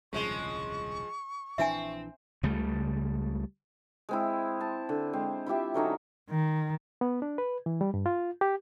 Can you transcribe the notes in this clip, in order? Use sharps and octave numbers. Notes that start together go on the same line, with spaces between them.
D#1 C2 C#3 F3 G#3 C#6
A#1 E3 C4 D4 E5 G#5
C#2 C#3 G3 A3
G#3 C4 E4
A5
D3
G#3 C4
E4 F4 G4 E5
D3 F#3 C#4 D#4
D#3
B3
D4
B4
E3
G3
G2
F4
G4